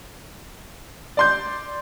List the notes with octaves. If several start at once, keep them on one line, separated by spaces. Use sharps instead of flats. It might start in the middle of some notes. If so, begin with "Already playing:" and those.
D5 C6 G6